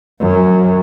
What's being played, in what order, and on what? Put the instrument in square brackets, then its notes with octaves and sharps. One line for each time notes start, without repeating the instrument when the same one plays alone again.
[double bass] F#2